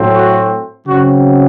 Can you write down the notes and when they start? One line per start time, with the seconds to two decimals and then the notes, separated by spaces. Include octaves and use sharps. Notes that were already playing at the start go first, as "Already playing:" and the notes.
Already playing: A2 F#3 A3 C4
0.14 F#4
0.85 C#3 F#3 C4 F#4